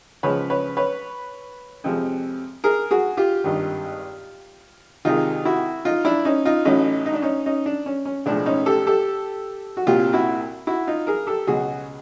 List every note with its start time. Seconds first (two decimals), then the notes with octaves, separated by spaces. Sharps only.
0.23 C#2 C#3 F3 G#3 B4 C#5
0.50 B4 C#5
0.77 B4 C#5
1.84 F2 C3 F3 G#3
2.64 G#4 A#4
2.91 F#4 G#4
3.17 F4 G4
3.44 G#1 G2 D#3
5.05 C2 C3 D#3 G#3 D#4 F4
5.45 E4 F#4
5.85 D#4 F4
6.05 D4 E4
6.25 C#4 D#4
6.45 D#4 F4
6.65 A1 A2 F#3 C#4 D#4
7.06 D#4
7.14 D4
7.22 C#4 D#4
7.46 C#4 D#4
7.66 D4
7.86 C#4
8.05 C#4
8.26 B1 A2 F3 G#3 D4
8.46 C#4 D#4
8.66 G4 A4
8.87 G4 A4
9.77 F#4
9.87 C2 A#2 F#3 F4 G4
10.13 E4 F#4
10.67 E4 F#4
10.87 D#4 F4
11.07 G#4 A#4
11.27 G4 A4
11.47 C#2 B2 F#3 F#4 G#4